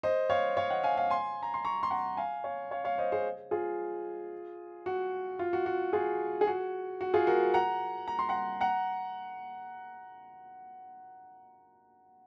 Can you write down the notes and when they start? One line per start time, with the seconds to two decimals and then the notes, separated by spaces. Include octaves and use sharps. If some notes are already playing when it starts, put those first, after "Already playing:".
0.03 C5 D#5
0.30 C#5 F5
0.57 C#5 F5
0.70 D#5 F#5
0.83 F5 G#5
0.97 F5 G#5
1.10 G#5 C6
1.43 A#5
1.54 C6
1.65 A#5 C#6
1.83 C6
1.91 F#5 A#5
2.17 F5 G#5
2.44 C#5 F5
2.71 C#5 F5
2.85 C#5 F5
2.98 C5 D#5
3.12 G#4 C5
3.51 F4 G#4
4.86 F#4
5.39 F4
5.53 F#4
5.66 F#4
5.93 F4 G#4
6.41 G#4
6.47 F#4
7.01 F#4
7.14 F4 G#4
7.27 F#4 A#4
7.54 F#5 A#5
8.08 A#5
8.19 C6
8.29 F#5 A#5
8.61 F#5 A#5